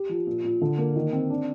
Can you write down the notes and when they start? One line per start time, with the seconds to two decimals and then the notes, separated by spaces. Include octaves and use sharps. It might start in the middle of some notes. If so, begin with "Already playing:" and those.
Already playing: G4
0.09 F3
0.27 A#2
0.44 A#2
0.61 D3
0.78 A#3
0.95 D#3
1.13 C4
1.30 D4